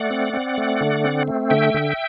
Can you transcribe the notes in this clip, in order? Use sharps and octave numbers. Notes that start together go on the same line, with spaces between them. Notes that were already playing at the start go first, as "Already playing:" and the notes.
Already playing: A3 D5 F#5
C4
C4
A3
D3
C4
A3
D3 E5 G5
D3